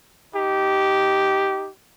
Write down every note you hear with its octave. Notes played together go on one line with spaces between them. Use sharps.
D#4 G4